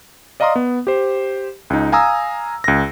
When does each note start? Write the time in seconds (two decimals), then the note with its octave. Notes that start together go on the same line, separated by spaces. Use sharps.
0.40 D5 D#5 F5 A#5 C6 D#6
0.56 B3
0.87 G4 C5
1.70 C#2 D#4
1.92 F5 G#5 A#5 D#6 E6
2.64 C#2 A#6